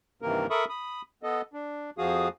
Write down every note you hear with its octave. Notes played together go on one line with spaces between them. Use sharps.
G2 C3 D#3 E3 A#3 A#4
A4 A#4 E5 B5 C#6 D#6
B5 D#6
B3 A4 D#5
D4
F2 F3 F#4 G#4 F5 D#6